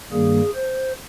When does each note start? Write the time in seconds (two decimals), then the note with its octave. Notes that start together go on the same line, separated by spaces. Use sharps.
0.11 G2 D#3 G3 A#3 G#4
0.54 C5